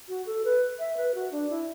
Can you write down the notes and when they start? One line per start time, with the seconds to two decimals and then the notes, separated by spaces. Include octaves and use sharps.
0.09 F#4
0.26 A4
0.45 B4
0.79 E5
0.97 B4
1.15 F#4
1.32 D4
1.50 E4